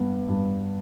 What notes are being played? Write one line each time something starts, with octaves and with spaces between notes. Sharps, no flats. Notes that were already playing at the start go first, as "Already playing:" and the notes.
Already playing: G2 B3
G2